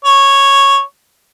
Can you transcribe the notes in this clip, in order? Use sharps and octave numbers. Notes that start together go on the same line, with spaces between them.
C#5